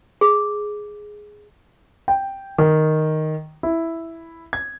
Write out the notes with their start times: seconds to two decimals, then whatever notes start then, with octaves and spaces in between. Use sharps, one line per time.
0.21 G#4
2.08 G5
2.58 D#3
3.63 E4
4.53 G#6